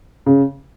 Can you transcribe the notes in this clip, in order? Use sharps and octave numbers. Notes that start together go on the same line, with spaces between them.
C#3